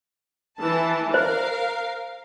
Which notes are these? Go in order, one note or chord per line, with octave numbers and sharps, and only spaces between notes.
E3 A5
A#4 C5 F5